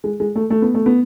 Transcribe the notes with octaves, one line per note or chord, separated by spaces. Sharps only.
G#3
G#3
A3
A3
B3
A3
B3